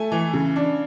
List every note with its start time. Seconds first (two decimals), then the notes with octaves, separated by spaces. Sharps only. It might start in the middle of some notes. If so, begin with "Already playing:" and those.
Already playing: A3 G#5
0.12 E3
0.33 C#3
0.56 D4